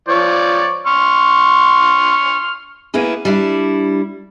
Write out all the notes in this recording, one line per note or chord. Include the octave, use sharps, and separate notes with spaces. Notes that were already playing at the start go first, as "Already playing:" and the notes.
F3 C#5 D5
C6 C#6 F6
A#3 B3 C#4 E4 G#4
G3 D4 E4